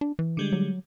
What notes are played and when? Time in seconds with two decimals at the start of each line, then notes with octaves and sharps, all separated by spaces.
0.01 D4
0.19 E3
0.37 D3 G3 G#3
0.53 F#3